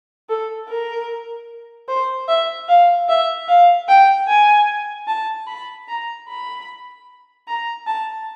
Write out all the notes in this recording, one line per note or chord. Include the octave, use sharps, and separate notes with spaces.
A4
A#4
C5
E5
F5
E5
F5
G5
G#5
A5
B5
A#5
B5
A#5
A5